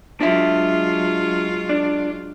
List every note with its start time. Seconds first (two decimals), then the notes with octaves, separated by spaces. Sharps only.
0.21 F#3 G#3 D4 F4 E5
1.69 D4